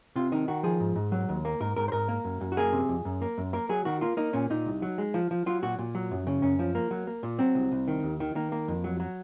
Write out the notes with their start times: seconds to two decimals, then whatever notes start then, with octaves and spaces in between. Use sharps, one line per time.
0.16 C3 F4
0.32 D#3 D#4
0.48 D#3 F#4
0.63 F3 G#4
0.80 G#2
0.96 G#2
1.12 F#3
1.29 D#2
1.45 A#3
1.60 G#2 A#4
1.76 G#2 A#4
1.88 C5
1.92 G#2 A#4
2.08 A#3
2.25 F#2
2.41 F#2
2.52 F#4
2.57 A#3 G#4
2.73 C3
2.89 F2
3.05 F#2
3.22 A#3
3.38 F#2
3.53 A#3 A#4
3.69 F#3 G#4
3.85 D#3 F#4
4.01 A#3 F4
4.17 A#3 D#4
4.33 A#2 C#4
4.50 A#2 D#4
4.66 C2
4.82 F#3
4.98 G#3
5.14 F3
5.31 F3
5.46 F#3 F4
5.62 A#2 F#4
5.79 A#2
5.95 F#3
6.11 F#2
6.27 C#3
6.42 F#2 C#4
6.59 F3
6.75 A#3
6.91 F#3
7.07 A#3
7.23 A#2
7.39 F#3 C4
7.55 C2
7.72 C2
7.88 D#3
8.03 D#2
8.20 D#3
8.35 D#3 A#3
8.52 A#3
8.68 F2
8.84 F#3
9.00 F#3